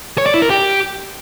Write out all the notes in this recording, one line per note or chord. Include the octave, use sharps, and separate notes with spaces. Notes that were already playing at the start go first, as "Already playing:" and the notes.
C#5
D5
E4
A#4
G4